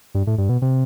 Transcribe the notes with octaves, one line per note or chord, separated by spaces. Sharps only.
G2
A2
G2
B2
C3